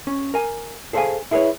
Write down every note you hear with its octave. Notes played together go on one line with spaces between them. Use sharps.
C#4
A#4 G#5
G#4 A4 C5 D#5 F5 G#5
E4 G#4 A4 B4 C#5